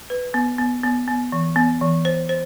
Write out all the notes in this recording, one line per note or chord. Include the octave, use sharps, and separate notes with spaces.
B4
B3
B3
B3
B3
E3
B3
E3
C5
C5